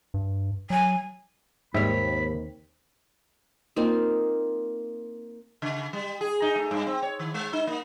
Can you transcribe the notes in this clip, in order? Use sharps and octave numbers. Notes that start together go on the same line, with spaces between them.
G2
F#3 G#5
D#2 G#2 G3 C4 C#5 E5 B5
A#3 C4 D#4 F4
C#3
G3
G#4
D#4
A3
G2
C4
C#5
D#3
G#3
D#4
A#3